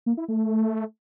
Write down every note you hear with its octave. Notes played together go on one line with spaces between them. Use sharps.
A#3
E4
A3